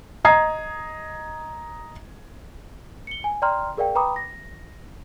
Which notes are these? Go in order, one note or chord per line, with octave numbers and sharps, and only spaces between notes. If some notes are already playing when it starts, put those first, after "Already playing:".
D#5 A#5 D#6 G#6 C7
C#7 G7
G#5
D5 G5 A#5 C6 F6
G#4 A#4 D5 F5 G5
B4 G5 A#5 B5 D6 D#6
A#6